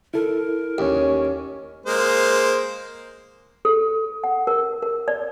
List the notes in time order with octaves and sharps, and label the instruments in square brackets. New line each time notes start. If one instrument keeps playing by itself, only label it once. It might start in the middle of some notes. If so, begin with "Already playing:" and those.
[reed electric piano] E4 A4 [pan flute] A#4
[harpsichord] D#2 [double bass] C#4
[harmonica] G#3 A#3 C5
[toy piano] A4
F#5
A#4
A#4
D5